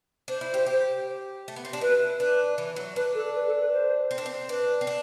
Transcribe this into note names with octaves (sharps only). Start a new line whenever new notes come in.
D4 C5
E4
G4
G4
A3
B3
C4
D4
E4 B4
D4 B4
E3
F#3
D4 B4
A4
B4
A4
B4
C5
C4
D4
C4
D4 B4
C4
D4